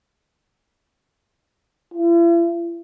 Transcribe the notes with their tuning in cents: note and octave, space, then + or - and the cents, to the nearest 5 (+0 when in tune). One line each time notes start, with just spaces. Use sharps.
E4 +45